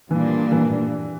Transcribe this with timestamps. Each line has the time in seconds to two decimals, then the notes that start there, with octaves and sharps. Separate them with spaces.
0.11 A#2 E3 G3 A#3 D4
0.52 E3